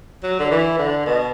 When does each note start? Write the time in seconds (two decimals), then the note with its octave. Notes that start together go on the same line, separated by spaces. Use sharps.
0.23 F#3
0.39 D3
0.51 E3
0.78 D3
1.06 B2